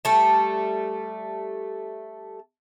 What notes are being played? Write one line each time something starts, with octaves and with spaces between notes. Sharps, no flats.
G3 A3 A5